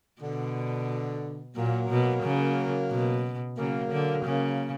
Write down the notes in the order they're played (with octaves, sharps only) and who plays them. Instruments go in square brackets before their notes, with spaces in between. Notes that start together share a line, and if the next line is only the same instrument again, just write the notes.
[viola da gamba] B2 [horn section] D3
[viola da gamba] A#2 [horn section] F#3 A#3
[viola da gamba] B2
C#3
B2
[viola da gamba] C#3 [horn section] F#3 A#3
[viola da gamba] D3
C#3